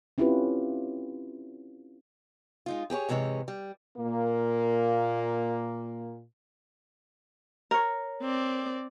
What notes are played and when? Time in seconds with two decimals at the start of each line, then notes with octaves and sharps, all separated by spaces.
0.18 C4 C#4 E4 F4 G4 B4
2.66 G#3 D#4 F4
2.90 G4 G#4 B4 C#5
3.09 G#2 C3 E3 G#3 C#5
3.48 G3
3.97 A#2 A#3
7.71 A#4 C#5
8.22 C4 D5